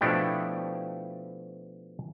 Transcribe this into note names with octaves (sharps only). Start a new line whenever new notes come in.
B2 F3 A3 D4 E4 G4